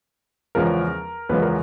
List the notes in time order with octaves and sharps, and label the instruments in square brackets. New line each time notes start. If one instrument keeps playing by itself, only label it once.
[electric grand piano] E2 C#3 F3 G#3 B3 A#4
E2 C#3 F3 G#3 B3 B4
A#4